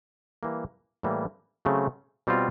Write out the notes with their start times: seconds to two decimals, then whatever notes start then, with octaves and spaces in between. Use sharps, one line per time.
0.43 E3 G3 A#3
1.03 A2 E3 G3 A#3
1.65 C#3 F#3 A3 C4
2.27 B2 G3 C4 F4